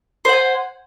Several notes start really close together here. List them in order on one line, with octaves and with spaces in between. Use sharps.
C5 F#5 G#5